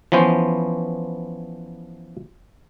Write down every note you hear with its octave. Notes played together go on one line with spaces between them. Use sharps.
E3 F3 B3 C#4 C5